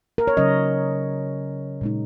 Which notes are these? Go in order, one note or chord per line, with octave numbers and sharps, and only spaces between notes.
A#4
C#5
C#3 F#3 C#4 D#5
A#2 G#3 D#4